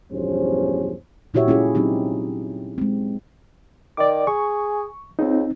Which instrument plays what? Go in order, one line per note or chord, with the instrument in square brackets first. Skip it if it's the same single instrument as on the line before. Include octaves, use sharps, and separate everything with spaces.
[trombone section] B1 E2 G2 F3 C#4 C5
[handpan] A#2 E4 F#4 G4 C#5 E5
C#4 E4 F4 G#4
F#3 C4 D#4 G4
G#3 C4
[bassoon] D#3 [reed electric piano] D5 D6
[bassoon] G#4 [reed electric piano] C#6
[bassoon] C#2 [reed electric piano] C4 D#4